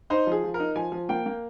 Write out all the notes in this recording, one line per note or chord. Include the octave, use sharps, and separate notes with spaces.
D#4 C5
F3 G#4
F3
A#4
D#4
F3 G#5
F3
A#3 G5
A#3